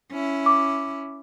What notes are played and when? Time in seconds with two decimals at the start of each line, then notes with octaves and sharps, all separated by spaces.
0.12 C#4 E4
0.46 D6